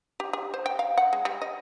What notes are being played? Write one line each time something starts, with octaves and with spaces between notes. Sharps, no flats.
G4
G4
C5
G5
F5
F#5
G#3
G3
D#5